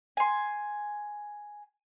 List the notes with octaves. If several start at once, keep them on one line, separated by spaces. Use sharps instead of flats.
G#5 C6